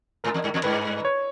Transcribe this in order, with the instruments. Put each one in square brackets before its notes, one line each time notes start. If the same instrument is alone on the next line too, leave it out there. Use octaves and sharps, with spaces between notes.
[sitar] G#2 [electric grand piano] A#4
[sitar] E2
G2
E2
[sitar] G2 [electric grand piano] B4
[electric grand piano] C#5